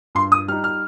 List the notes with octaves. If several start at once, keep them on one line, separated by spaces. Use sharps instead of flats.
G2 C6
D#6
G3 D#4 F6
F6